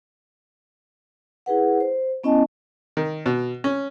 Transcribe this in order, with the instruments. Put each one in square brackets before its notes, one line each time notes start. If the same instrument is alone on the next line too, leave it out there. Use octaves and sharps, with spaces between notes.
[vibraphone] E4 G#4 B4 F#5
C5
B3 C#4 E4 D#5 G#5 A5
[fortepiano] D#3
B2
C#4